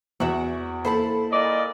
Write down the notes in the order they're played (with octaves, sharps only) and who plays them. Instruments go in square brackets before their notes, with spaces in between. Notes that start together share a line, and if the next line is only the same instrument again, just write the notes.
[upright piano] E2 [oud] F#4 E5
[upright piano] A#3 B5 [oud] E4 A4 C5
[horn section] A#2 D5 D#5